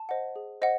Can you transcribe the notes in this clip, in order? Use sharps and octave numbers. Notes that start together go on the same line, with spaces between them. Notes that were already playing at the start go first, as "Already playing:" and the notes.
Already playing: A5
C5 D#5 F#5
G#4
C5 D#5 F#5